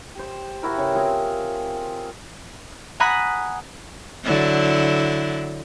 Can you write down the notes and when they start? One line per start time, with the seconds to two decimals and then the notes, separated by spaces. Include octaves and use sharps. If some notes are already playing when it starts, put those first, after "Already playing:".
0.15 G4 C5
0.63 E4 F#4 G4 A#4
0.77 C#3 E3
0.95 C4 F4 G#4 A#4
3.00 F#5 G#5 A#5 B5 D#6 F#6
4.24 D3 F#3 E4